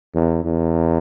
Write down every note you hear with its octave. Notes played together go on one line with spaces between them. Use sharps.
E2
E2